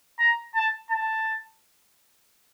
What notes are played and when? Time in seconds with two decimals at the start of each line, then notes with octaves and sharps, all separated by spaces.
0.19 A#5
0.55 A5
0.90 A5